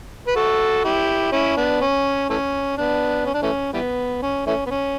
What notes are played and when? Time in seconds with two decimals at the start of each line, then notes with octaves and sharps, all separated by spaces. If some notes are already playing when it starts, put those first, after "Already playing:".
0.27 B4
0.36 F#4 A4
0.85 E4 G4
1.32 C#4 E4
1.57 B3 D4
1.81 C#4
2.30 E3 A3 C#4
2.78 B3 D4
3.25 C#4
3.34 D4
3.42 E3 A3 C#4
3.73 E3 G3 B3
4.22 C#4
4.46 E3 A3 C#4
4.66 B3
4.71 C#4